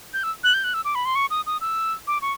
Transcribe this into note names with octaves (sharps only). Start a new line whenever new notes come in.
G6
E6
F#6
G6
F#6
E6
D6
B5
C6
C#6
D#6
D#6
E6
D6
C#6